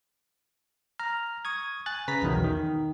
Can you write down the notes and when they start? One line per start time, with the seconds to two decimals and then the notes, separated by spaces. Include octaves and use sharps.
0.99 A#5 F6
1.45 C#6 D#6 G#6
1.86 G#5 F#6 A6
2.08 C#3 B4 A#5 B6
2.22 B1 E2 D#3 F#3
2.44 D#3